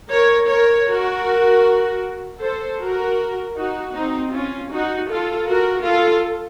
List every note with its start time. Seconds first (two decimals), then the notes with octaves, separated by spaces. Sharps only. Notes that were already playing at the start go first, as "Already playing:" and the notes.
0.11 A#4 C#5
0.50 A#4 C#5
0.88 F#4 A#4
2.41 A4 C5
2.80 F#4 A#4
3.56 D#4 F#4
3.95 C4 D#4
4.33 C#4 F4
4.72 D#4 F#4
5.10 F4 A4
5.49 F#4 A#4
5.86 F4 A4